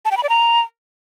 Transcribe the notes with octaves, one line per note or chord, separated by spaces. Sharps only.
A5
G5
B5
D5
A#5